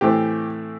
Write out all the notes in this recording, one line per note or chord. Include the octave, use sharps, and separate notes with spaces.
A2 E3 A3 C4 G4